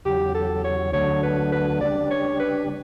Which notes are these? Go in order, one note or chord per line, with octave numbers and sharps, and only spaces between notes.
E2 C#3 F#3 G4
A4
C#5
D2 D3 F#3 A3 C#5
B4
B4
C#3 G3 D4 D5
C#5
B4